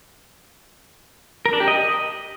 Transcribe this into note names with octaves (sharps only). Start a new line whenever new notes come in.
A#4
D4
G4
D#5